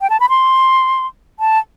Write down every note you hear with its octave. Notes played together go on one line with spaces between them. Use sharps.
G5
A5
B5
C6
A5